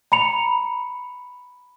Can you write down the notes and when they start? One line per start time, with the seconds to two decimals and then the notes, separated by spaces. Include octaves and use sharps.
0.12 A#5 B5 C#7 F7